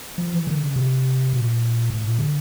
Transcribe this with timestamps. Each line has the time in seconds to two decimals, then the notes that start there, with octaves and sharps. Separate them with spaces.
0.18 F3
0.33 E3
0.47 D3
0.61 C#3
0.76 C3
1.33 A#2
1.90 A2
2.04 A#2
2.19 D3